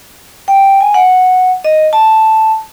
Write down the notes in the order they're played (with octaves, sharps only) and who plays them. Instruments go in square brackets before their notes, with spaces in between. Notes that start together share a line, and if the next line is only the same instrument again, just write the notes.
[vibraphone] G5
G#5
F#5
D#5
A5